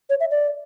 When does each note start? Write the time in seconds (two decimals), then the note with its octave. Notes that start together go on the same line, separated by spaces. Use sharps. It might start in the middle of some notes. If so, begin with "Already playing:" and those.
0.10 C#5
0.20 E5
0.31 D5